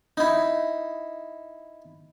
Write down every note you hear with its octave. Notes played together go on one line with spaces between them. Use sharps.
D#4 E4